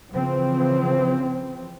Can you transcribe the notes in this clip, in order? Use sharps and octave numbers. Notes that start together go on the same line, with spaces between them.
C#3 E3 F3 C4